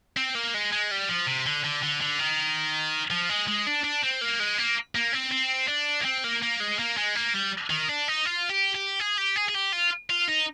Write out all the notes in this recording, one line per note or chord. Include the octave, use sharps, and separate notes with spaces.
C4
A#3
G#3
G#3
G3
F3
C3
D3
D3
D3
D3
D#3
F3
G#3
G#3
D4
D4
C4
A#3
G#3
A#3
A#3
C4
C4
D4
A#3
C4
A#3
A#3
G#3
A#3
G#3
A#3
G3
D#3
D4
D#4
F4
G4
G4
G#4
G4
G#4
G#4
G4
F4
F4
D#4